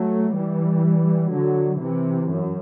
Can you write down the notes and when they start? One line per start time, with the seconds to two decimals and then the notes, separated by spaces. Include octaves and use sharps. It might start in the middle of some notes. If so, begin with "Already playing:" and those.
Already playing: F#3 A3
0.35 E3 G3
1.31 D3 F#3
1.79 C3 E3
2.28 F#2